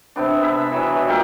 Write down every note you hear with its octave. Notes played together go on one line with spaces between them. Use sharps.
C3 B3 D4
B3 G#4 E5 B5
E3 F#3
B2
A#2 G4 A#4 E5